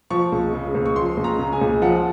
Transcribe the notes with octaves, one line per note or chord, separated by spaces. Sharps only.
F3 C#6
C#2
C#3
C#2
C#6
F3 C6
C#2
A#5
C#3
G#5
C#2
F3 F#5